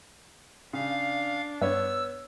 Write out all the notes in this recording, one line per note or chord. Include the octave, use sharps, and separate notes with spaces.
C#3 D4 F5
G2 B3 C#5 E6